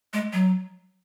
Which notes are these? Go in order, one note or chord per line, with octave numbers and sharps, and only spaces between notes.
G#3
F#3